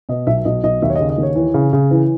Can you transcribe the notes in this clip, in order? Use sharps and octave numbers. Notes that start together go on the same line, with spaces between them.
B2 D#5
B1 E5
B1 D#5
B1 D#5
D#2 E5
C#5
C#3 D#5
D#5
D#2
C#5
E3
C#3
C#3
E3